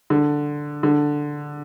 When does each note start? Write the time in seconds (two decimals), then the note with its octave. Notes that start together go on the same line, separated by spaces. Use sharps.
0.10 D3
0.83 D3